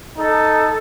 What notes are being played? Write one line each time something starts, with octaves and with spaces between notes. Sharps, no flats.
D#4 A4